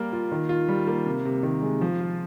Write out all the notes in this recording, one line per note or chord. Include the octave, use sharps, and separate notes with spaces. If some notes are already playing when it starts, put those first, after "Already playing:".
Already playing: G3 A#3 A#4
F4
D#3
F4
G3
A#3
C3
C3
D#3
G#3
F3
F4